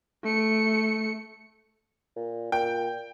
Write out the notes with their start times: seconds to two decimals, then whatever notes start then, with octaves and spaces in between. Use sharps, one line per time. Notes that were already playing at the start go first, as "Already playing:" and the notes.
0.24 A3 C#7
2.16 A#2
2.52 A#2 G5